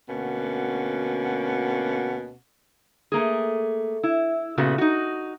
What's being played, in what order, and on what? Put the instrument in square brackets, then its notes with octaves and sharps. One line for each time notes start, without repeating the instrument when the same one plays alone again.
[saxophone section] D2 B2 A#3 C#4 F#5
[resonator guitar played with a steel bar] A3 A#3 G#4
E4
A#2 C#3 A3 B3 F#4
D#4 F#4